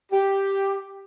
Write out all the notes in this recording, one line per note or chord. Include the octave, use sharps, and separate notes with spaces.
G4